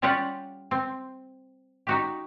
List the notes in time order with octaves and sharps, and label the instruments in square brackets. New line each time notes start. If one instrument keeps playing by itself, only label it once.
[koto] G3 C#4 F4 G4 D5 F#5
C4
D#4 F#4 G4